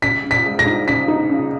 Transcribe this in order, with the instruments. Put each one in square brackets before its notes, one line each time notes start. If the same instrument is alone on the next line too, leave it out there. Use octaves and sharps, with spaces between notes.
[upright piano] C#3 [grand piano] B6
[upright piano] C#3
[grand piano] B6
[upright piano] G#3
[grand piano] A#6
[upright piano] D#4
[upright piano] C#3 [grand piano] B6
[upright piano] D#4
C#3